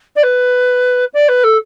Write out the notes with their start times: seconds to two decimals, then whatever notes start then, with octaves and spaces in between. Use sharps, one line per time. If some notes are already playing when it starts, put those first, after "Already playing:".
0.15 D5
0.23 B4
1.13 D5
1.28 B4
1.43 A4